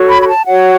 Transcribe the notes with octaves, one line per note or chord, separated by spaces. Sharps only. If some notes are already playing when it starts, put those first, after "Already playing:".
Already playing: F#4 A4 C#5
B5
B5
A5
F#4 C#5 F#5